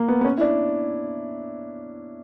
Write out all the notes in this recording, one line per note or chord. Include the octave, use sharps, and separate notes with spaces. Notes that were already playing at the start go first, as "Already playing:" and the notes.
Already playing: A#3
B3
B3
C#4
E4
D4